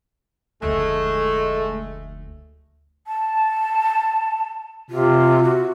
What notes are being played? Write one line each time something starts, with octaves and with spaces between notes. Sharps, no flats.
F1 D2 G#3 A3
A5
C3 F4
F#4